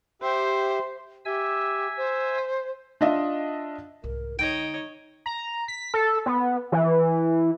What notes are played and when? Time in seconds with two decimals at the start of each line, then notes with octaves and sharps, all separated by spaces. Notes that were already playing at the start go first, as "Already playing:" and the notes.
0.22 G4 C5 E5
1.25 G4 E5 G#5 E6
1.97 C5
3.01 D4 F4 D#5 E5
4.03 C2 G#2 A#4
4.39 D3 G#3 D#4 C#5 D#5 G5
5.26 A#5
5.68 B6
5.94 A4
6.26 B3
6.72 E3